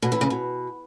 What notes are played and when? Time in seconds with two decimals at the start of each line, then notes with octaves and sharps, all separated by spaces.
0.02 B2
0.12 E3
0.21 C#3
0.30 B2